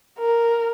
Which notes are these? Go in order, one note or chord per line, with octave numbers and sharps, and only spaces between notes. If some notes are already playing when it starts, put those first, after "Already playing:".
A#4